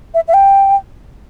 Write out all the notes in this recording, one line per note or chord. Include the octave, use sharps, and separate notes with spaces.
E5
E5
G5